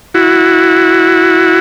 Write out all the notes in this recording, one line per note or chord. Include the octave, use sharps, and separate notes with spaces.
E4 F#4